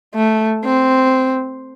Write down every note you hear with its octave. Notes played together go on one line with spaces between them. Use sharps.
A3
C4